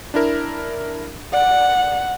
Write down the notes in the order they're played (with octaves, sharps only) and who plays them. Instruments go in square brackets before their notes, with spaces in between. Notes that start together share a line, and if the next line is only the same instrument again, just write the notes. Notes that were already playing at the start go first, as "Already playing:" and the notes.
[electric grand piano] D4 E4 A#4
[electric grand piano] D5 [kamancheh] F#5